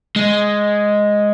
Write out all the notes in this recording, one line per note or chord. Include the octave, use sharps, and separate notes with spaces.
G#3